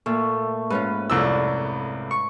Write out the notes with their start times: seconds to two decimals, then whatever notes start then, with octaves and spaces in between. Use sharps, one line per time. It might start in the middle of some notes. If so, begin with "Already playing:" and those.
0.06 A#2 A3
0.70 G#2 C#4 F4 B4
1.10 C2 F2 D5 E6
2.11 C#6